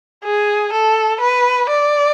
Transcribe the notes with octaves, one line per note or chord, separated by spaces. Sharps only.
G#4
A4
B4
D5